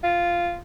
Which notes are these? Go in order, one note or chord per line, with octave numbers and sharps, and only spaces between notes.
F4